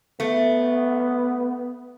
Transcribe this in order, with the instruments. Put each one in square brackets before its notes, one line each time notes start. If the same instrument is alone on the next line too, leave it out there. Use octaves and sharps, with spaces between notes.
[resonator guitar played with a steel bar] A3 [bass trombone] B3